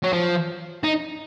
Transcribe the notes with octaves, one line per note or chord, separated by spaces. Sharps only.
F#3
F3
D#4